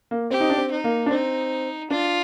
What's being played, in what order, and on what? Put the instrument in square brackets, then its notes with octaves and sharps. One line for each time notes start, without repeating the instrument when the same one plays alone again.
[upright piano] A#3
[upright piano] C4 [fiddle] G4
[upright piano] D#4
D4
C4
[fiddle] D#4
[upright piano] A#3
D4
[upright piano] C4 [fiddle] D#4
[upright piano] D4 [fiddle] F4